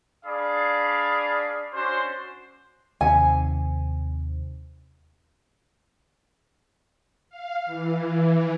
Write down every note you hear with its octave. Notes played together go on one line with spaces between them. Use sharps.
D4 G#4 D5 F5 B5
C#4 D4 F#4 C5
D#2 C3 G#5
F5
E3